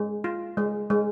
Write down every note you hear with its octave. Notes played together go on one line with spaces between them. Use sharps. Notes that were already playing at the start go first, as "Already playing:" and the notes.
Already playing: G#3
F4
G#3
G#3